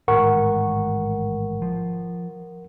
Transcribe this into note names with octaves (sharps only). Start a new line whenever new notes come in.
A1 G#2 D#3 A#4 F#5 C#6
F3